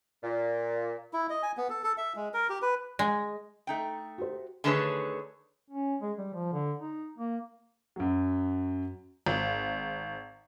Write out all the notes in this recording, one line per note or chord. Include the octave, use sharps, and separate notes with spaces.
A#2
E4
D#5
G#5
B3
A4
A4
E5
G#3
A#4
G4
B4
G#3
A3 D#4 G5
F#4 G4 C5
D3 D#3 A3 G#4 B4 C#5
C#4
G#3
G3
F3
D3
D#4
A#3
F#2 F#3
G#1